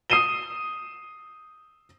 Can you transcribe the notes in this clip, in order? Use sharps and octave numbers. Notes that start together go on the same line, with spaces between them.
D#6 C7 D#7 E7 G7